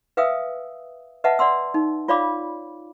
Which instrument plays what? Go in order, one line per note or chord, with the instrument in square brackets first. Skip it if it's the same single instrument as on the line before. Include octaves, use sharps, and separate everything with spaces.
[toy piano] B4 E5 F5 G5 D#6 E6
B4 D#5 E5 F#5 A5
D5 F#5 C6 E6
D#4
F4 C#5 D5 F5 B5 D6